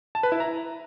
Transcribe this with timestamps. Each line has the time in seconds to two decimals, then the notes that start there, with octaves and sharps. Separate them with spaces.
0.15 A5
0.23 B4
0.32 E4
0.40 A#5